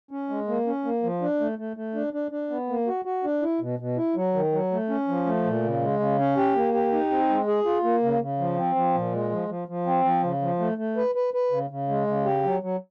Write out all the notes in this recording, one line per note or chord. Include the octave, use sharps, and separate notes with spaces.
C#4
G#3
A#3
C#4
A#3
F3
D4
A3
A3
A3
D4
D4
D4
B3
A#3
F#4
F#4
D4
E4
B2
B2
E4
F#3
D#3
F#3
A3
C#4
F3
A3
A#2
C#3
G#3
C#3
C#4
G4
A#3
G4
D#4
C4
G#3
G#4
F4
A#3
C#3
C#3
F3
C4
F3
A#2
G#3
F3
F3
F3
C4
F3
C#3
F3
A3
A3
B4
B4
B4
C#3
C#3
G#3
C#3
G4
F#3
F#3